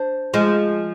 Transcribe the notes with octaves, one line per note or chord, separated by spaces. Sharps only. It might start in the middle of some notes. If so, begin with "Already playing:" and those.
Already playing: D4 C5
F3 G#3